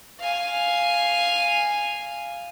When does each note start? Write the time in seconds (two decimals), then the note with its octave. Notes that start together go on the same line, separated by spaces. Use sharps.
0.20 F5 G#5